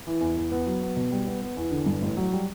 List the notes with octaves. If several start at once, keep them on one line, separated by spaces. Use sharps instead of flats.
E3
E2
E2
B3
F#3
B3
B2
G3
B3
B3
E2
D3
G2
A1
F#3
G3